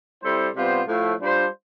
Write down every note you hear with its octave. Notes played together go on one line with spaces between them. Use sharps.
G3 C4 E4 A4 C5
C3 G3 B3 F4 C5
A2 F3 A3
G3 D4 F4 C5